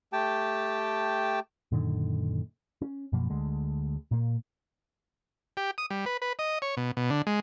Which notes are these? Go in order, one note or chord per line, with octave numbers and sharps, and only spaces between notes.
A3 G4 G5 A5
F#2 A#2 D3 D#3
C#4
F#2 B2 F3 A#3
D2 D3 G#3
A#2 A#3
G4
D#6
G3
B4
B4
D#5
C#5
B2
B2
D3
G#3